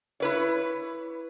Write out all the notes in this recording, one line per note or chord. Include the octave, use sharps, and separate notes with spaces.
E4 B4 C#5